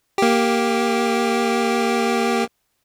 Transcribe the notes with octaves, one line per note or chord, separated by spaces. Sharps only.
A#3 G4